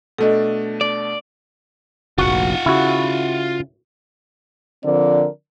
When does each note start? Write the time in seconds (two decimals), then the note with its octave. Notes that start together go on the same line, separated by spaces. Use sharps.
0.18 B2 A3 D4 A4 D#5
0.81 D5
2.18 F1 A#1 F4 F#4 F#5
2.66 C#3 E4 F#4
4.84 D3 F3 C4 A#4 D5